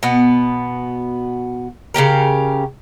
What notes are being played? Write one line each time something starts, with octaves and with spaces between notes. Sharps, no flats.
B2 B3
C#3 E3 G4 A#4